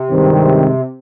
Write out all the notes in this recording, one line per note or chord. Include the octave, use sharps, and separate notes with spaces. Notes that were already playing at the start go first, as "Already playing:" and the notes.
Already playing: C3
G2 D#3 G#3 C4